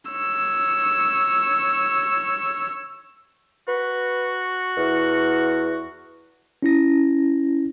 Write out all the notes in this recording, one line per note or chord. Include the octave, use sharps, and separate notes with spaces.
C#5 E6
F#4 B4
E2
C#4 E4 A#6